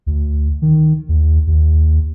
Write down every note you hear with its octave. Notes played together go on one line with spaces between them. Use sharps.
D2
D#3
D#2
D#2